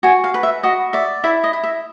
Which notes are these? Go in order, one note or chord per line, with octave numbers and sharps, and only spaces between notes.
F#4 G#5
F5
B4
E5
F#4 D#5
D5 E5
E4 E5
D#5
E4
E5